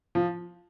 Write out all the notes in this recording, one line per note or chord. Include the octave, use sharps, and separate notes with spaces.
F3